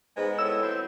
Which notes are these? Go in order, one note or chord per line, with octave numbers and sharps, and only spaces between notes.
G#2 G#3 B3
A2 E6
E3 F#3 C4